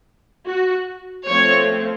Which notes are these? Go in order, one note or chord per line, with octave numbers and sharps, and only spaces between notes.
F#4
F3 A3 C4 C#5